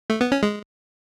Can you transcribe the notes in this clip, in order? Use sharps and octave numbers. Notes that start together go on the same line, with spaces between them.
A3
B3
C#4
G#3